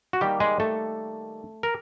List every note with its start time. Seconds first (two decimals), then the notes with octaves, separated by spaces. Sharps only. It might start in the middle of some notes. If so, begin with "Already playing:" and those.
0.13 F#4
0.21 D#3 G3 A#3 G4
0.40 G#3 G#4
0.60 A3 A4
1.63 A#4